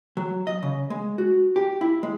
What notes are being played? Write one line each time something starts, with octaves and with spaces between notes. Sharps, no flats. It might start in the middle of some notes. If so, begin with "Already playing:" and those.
F#3
D#5
C#3
G#3
F#4
G4
E4
G#3